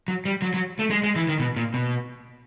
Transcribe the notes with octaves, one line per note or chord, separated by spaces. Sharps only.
F#3
G3
F#3
F#3
A3
G#3
G#3
E3
D#3
B2
A#2
B2